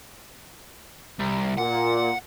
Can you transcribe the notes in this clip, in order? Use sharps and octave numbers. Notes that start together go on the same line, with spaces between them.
C2
A#2 F#5